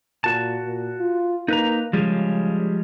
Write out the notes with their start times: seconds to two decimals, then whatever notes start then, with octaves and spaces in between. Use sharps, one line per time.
0.24 A#2 F#4 A5
0.65 A#2
1.00 F4
1.48 A#3 D#4 B4 A#5
1.93 C#3 F3 G3 G#3